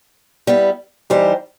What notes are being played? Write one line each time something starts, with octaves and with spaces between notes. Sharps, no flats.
G3 B3 E4
E3 G3 D#4 G4 C5